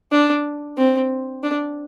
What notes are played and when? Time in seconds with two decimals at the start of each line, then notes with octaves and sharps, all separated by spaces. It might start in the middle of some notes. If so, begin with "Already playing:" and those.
0.11 D4
0.77 C4
1.43 D4